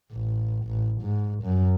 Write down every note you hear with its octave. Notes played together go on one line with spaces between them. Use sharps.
A1
A1
G#2
F#2